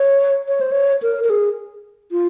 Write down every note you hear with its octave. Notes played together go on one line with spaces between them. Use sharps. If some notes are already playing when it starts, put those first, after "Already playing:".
Already playing: C#5
C#5
C5
C#5
A#4
A#4
G#4
F4